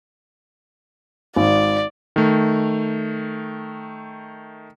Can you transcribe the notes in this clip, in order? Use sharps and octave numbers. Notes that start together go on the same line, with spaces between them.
G#1 D5
D#3 A3